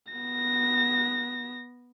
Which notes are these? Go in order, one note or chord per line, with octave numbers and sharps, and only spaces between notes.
B3 A#6